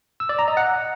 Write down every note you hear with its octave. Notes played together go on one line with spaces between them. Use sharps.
E6
D5
A#5
D#5
F#5